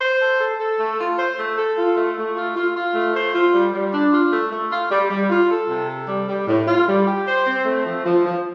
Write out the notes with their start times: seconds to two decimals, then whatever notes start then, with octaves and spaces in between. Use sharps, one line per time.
0.01 C5
0.20 A4
0.40 A4
0.59 A4
0.79 A3
0.99 F4
1.17 C5
1.37 A3
1.57 A4
1.77 F4
1.97 A3
2.16 A3
2.35 F4
2.55 F4
2.75 F4
2.95 A3
3.14 C5
3.34 F4
3.53 G3
3.72 G3
3.93 D4
4.12 F4
4.32 A3
4.52 A3
4.72 F4
4.91 G3
5.10 G3
5.30 F4
5.50 A4
5.69 C3
5.88 A4
6.08 G3
6.28 G3
6.48 A2
6.67 F4
6.87 G3
7.06 G4
7.26 C5
7.46 C4
7.65 A3
7.85 F3
8.05 F3
8.25 F3